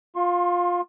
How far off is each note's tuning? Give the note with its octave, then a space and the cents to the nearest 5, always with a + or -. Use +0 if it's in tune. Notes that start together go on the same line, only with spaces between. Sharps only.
F4 +15 C6 +40